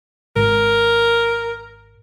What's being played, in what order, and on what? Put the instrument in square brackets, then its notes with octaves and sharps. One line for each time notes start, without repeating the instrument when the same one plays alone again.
[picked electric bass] G#1 [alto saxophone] A#4